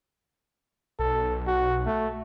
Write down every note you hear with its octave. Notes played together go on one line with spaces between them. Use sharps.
B1 A4
F#4
A3